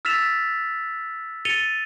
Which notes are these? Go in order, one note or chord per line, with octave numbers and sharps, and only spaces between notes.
E6 F6 A6 B6 E7 F7
A6 C#7 D#7 F7 G7